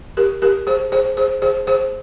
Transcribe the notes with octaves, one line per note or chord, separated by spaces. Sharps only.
G4 A#4
G4 A#4
G#4 C5
G#4 C5
G#4 C5
G#4 C5
G#4 C5